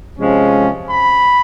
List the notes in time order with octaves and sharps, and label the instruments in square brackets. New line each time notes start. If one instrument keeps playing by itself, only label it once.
[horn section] C3 F3 G#3 C#4
B5